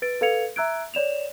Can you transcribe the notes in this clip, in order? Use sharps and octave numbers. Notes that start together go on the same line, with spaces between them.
B4 A6 D7
A4 B4 F5 G#6 C#7 F7
E5 A#5 E6 F#6 G#6 D7
C#5 D5 E7 F7